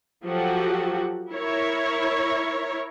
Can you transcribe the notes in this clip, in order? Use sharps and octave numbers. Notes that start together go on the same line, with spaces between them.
F3 F#3 F#4 G4 A4 F#5
E4 A#4 C#5